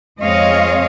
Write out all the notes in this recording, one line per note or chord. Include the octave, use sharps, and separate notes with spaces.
F2 G#3 C4 C#5 D#5 F5